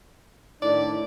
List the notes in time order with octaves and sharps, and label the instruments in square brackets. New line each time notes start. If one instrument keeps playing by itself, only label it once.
[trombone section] A2 D#3 D4 [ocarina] E4 [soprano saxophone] D5